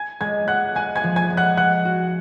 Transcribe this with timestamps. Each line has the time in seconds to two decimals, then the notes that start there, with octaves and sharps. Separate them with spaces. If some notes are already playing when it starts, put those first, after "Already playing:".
Already playing: G#5 G#6
0.21 G#3 G#5 G#6
0.48 G#3 F#5 F#6
0.75 G#3 G#5 G#6
0.96 G#5 G#6
1.04 F3
1.16 G#5 G#6
1.30 G#3
1.37 F#5 F#6
1.57 G#3 F#5 F#6
1.85 F#4